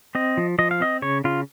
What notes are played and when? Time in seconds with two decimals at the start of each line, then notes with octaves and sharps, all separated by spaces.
0.15 C4 D#5
0.37 F3
0.59 F3 D#5
0.71 F5
0.80 C4 D#5
1.02 C#3 C#5
1.24 C#3 F4